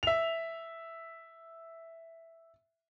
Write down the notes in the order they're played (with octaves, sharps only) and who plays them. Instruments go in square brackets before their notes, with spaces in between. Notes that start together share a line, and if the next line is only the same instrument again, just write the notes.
[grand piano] E5 F7